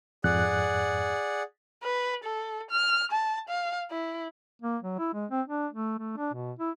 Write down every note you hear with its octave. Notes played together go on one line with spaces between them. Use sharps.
F2 G#2 G#4 D5 F#5 F#6
B4
A4
F6
A5
F5
E4
A#3
F#3
E4
G#3
C4
D4
A3
A3
D4
B2
E4